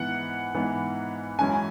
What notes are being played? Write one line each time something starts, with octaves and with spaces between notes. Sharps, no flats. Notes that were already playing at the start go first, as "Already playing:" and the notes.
Already playing: G#2 E3 B3 F#5
G#2 E3 B3
F#2 E3 G#3 C#4 G#5